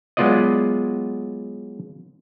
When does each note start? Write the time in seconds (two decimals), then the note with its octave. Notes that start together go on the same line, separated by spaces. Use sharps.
0.17 F#3 G#3 B3 F4 D5 D#5